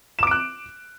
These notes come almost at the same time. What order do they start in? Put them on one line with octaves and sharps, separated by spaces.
E7 D6 D7 F#6